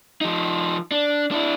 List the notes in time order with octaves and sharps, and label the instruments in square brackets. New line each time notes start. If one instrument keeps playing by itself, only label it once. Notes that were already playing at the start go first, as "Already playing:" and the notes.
[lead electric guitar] F3 D#4
D4
D4 E4